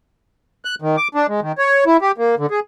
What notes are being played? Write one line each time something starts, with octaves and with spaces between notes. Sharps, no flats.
F#6
D#3
D6
D4
G#3
D#3
C#5
E4
G4
A#3
D3
G#4